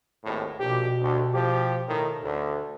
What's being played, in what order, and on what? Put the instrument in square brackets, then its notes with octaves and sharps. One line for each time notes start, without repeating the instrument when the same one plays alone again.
[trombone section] G#1 D#2 A2
[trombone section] A#1 G4 [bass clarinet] B2
[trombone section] D2
F3 G4
A2 D#3
D2